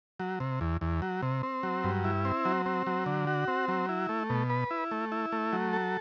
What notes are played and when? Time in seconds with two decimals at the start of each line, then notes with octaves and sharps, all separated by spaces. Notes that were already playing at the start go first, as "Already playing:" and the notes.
0.20 F#3
0.40 C3
0.61 E2
0.81 E2
1.02 F#3
1.22 C3
1.43 C4
1.63 F#3
1.84 G2
2.04 E4
2.25 C4
2.45 F#3
2.66 C4
2.87 F#3
3.06 D3
3.27 F#4
3.48 C4
3.68 F#3
3.89 E4
4.09 A3
4.30 B2
4.50 B4
4.71 E4
4.91 A3
5.12 E4
5.32 A3
5.53 F#3
5.73 A4